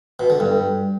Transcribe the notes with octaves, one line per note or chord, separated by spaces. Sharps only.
B2
D3
G2